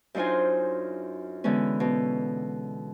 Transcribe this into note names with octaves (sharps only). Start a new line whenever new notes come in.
F#2 D4 D#4 F4 C5 G#5
D3 E3 G#3 B3 C#4
B2